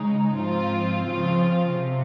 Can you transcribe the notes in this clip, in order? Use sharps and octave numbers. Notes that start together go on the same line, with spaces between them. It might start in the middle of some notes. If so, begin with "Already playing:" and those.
Already playing: C#3 G#3 D#4
G#2 F3 C4 F4
C#3 F3 C4 F4
C3